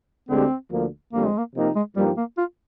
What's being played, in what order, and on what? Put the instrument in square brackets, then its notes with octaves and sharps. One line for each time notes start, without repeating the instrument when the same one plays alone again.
[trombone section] D2 D3 G#3 D4 G4 [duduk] C4
[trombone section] D2 D3 F3 A#3
[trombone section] F2 D3 G3 C4 [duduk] A#3
[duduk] G#3
A#3
[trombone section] C3 F3 A#3 D#4 G4
[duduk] G#3
[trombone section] G2 F3 A#3 D#4 G4 [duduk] G3
[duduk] A#3
F4